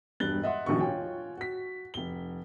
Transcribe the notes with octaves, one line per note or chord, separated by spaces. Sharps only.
E1 G2 F#6 A6 G7
D#5 E5 F#5 C6
D#1 A#1 D#2 B2 D4 C#6
F4 C#5 G5 G#5
F#4 B6
F1 G7